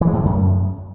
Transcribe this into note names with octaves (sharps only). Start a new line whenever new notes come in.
E3
G#3
A2
D3
F#2